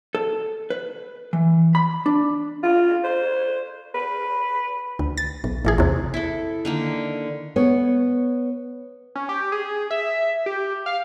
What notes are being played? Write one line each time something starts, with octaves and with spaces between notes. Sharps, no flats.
A4
B4
E3
B5
D4
F4
C5
B4
D2
A6
B1
A1 E3 G#4
E2 C3
E4 A4
D3 D#3 A#3
B3 C#5
C#4
G4
G#4
E5
G4
F5